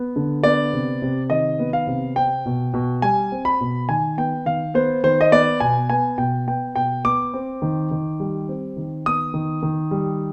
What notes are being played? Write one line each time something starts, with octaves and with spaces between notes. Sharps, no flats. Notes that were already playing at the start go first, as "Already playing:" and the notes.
Already playing: B3
D3
B3 D5
C3
C3
D#3 D#5
B3
F5
C3
C4 G5
B2
B2
G3 G#5
C4
B5
B2
D#3 G#5
B3 G5
D#3 F5
B3 C5
D#3 C5
D#5
B3 D5
B2 G#5
B3 G#5
B2 G5
B3 G5
B2 G5
B3 D6
C4
D#3
D#3
G3
C4
D#3
B3 D#6
D#3
D#3
G3